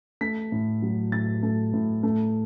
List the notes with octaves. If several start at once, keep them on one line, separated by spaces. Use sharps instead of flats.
A3 B6
A2
F#3
A2 A6
A3
A2
A3